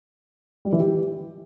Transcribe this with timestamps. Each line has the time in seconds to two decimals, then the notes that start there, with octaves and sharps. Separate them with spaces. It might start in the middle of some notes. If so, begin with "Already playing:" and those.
0.65 G3
0.72 E3
0.80 G4